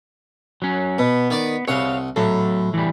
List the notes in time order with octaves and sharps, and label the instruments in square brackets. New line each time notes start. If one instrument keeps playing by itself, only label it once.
[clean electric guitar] F#3 C#4
[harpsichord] B2 [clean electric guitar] B3
[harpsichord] D#3 D5 D6
[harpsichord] C2 F#5 [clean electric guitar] C#5 F5
[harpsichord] A2 [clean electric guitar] F#3 A4
[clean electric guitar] E3 G3